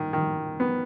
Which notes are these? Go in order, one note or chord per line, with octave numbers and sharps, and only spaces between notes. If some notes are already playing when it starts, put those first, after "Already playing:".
Already playing: D#3
D#3
B3